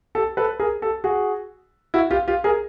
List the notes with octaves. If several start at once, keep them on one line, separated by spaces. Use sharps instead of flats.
G4 A4
A4 B4
G#4 A#4
G4 A4
F#4 G#4
E4 F#4
F4 G4
F4 G4
G#4 A#4